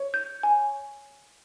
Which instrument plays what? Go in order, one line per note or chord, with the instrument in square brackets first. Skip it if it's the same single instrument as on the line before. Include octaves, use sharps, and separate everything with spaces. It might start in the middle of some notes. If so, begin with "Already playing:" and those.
Already playing: [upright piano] C#5
[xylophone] G6
G#5